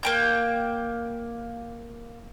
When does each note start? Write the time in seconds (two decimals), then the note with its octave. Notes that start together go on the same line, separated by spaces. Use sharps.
0.03 A#3 G5 G6